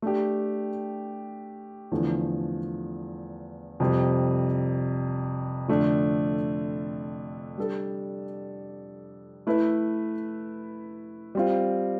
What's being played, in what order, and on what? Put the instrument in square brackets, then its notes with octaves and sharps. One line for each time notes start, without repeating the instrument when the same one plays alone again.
[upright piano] A3 D4 G4
E2 D3 F3 A3
F2 C3 G3 C4
F2 D3 A3 D4
G3 D4 A4
A3 E4 B4 E5
G3 C4 F4